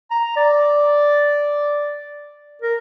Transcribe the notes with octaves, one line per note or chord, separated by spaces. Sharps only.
A#5
D5
A#4